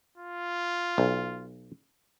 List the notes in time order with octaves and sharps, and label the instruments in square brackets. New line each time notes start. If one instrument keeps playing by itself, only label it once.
[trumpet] F4
[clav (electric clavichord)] B1